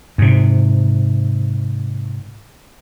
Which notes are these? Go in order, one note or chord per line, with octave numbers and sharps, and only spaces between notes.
G#2 C3